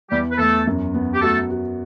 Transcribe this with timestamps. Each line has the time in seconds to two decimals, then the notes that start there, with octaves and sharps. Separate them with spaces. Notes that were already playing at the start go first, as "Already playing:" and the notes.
0.10 E2 G3 G4
0.32 B4
0.38 E2 A3 A4
0.67 F#2
0.94 B3
1.15 G4
1.22 A3 F#4 A4
1.50 F#4